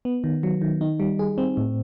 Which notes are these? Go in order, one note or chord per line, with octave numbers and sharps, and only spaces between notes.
B3
D#3
F#3
D#3
D#4
G3
G#4
C4
A2